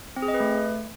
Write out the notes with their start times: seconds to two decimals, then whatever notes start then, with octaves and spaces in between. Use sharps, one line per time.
0.16 C4
0.22 G#4
0.28 D#5
0.34 B4
0.40 A3